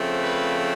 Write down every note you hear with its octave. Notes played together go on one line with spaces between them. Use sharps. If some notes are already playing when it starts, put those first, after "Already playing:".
Already playing: C#3 F3 A3 C4
B4